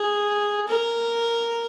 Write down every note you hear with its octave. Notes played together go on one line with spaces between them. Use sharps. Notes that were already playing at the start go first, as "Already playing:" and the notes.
Already playing: G#4
A#4